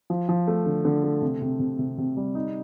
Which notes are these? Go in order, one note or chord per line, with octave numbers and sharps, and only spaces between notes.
F3
F3
A3
D3
D3
A3
C3
C3
C3
C3
C3
G3
D#4